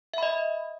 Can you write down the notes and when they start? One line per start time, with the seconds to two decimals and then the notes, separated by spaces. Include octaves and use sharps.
0.14 E5
0.18 B5
0.23 D#5